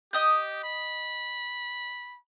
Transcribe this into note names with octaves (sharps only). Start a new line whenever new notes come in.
G4 D#5 D#6 G6
B5